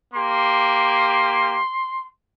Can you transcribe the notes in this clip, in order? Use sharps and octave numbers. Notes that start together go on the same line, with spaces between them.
A#3 G4 C6